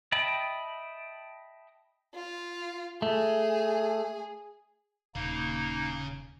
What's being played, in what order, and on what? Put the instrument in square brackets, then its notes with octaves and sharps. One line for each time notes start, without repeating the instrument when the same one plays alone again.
[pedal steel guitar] D#5 E5 G5 A5 B5
[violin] F4
[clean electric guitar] A3 [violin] G#4
[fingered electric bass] D#1 [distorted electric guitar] C#3 [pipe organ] A#3 D#4